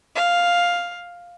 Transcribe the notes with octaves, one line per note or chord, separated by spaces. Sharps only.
F5